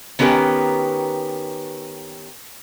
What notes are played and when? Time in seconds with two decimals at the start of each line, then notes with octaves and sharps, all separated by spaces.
0.19 D#3 B3 C#4 G4 A#4